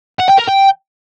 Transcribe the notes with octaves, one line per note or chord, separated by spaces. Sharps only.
F#5
G5
A#4
G5